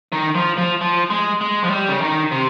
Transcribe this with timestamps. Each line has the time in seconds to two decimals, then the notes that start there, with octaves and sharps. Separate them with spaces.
0.12 D#3
0.35 F3
0.58 F3
0.81 F3
1.10 G#3
1.41 G#3
1.64 F3
1.70 G3
1.88 C#3
2.01 D#3
2.32 C3